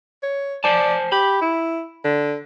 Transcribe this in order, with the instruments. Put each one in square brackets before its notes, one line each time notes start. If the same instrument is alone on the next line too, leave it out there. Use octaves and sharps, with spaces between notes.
[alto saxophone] C#5
[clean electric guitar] C5 G#5 A5 [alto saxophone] D5
[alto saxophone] G4 [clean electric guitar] B5
[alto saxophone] E4
D3